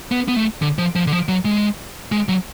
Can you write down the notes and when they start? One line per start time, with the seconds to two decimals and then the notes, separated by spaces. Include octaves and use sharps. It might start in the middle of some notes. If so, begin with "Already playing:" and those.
0.12 B3
0.28 B3
0.36 A3
0.62 D3
0.78 F3
0.96 F3
1.07 D3
1.12 F3
1.28 F#3
1.45 G#3
2.12 G#3
2.29 F#3